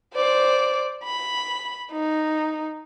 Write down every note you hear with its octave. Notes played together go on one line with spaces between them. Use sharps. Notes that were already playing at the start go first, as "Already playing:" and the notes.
C5 D5
B5
D#4